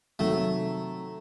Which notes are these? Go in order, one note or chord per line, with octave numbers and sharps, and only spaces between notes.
C3 D#3 F#3 A3